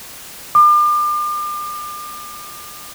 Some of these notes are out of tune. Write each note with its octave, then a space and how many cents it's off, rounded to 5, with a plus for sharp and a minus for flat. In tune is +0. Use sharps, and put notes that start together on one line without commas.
D6 +35